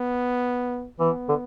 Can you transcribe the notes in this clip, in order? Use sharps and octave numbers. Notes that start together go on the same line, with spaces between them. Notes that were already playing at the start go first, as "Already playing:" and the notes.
Already playing: B3
E3 B3
D3